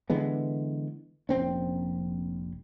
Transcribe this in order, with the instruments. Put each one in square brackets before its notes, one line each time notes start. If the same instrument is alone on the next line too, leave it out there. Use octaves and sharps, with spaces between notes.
[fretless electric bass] D3 E3 G#3 B3
F1 A#1 C4 C#4